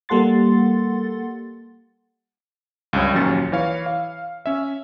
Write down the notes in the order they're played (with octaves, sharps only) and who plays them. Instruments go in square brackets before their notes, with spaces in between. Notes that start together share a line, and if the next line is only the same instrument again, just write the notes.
[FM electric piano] G3 A#3 A4 F#5 C6 A6
[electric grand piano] C#2 G2 C#5
A#1 D#2 F#3 C#4 A6 C#7
E3 C#5 F5
F5
C#4 E5